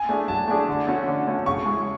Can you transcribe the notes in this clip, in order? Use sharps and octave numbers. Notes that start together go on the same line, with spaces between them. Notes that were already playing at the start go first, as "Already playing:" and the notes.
Already playing: G#5
A3 D4 G#4
F#3 A5
A3 D4 G#4
D3
A3 C#4 F#4
D3
A3 C#4 F#4
C#3 C#6
G#3 C#4 E4